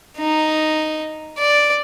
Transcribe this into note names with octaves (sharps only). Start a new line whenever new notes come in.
D#4
D5